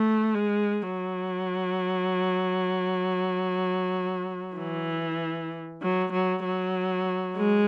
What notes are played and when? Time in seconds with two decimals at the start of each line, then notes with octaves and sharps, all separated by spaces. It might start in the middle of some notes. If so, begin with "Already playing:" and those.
Already playing: A3
0.35 G#3
0.82 F#3
4.57 E3
5.82 F#3
6.12 F#3
6.44 F#3
7.37 G#3